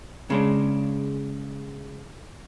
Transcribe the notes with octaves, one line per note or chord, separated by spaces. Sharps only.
C#3 G#3 D4